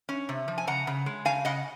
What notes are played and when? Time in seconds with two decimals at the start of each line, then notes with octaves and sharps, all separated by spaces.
0.09 C#4
0.29 C3
0.48 F3
0.58 G#5
0.67 C#3 F#5 A#5
0.87 C#3
1.06 G#3
1.25 C#3 F5 G#5
1.45 C#3 D#5 F#5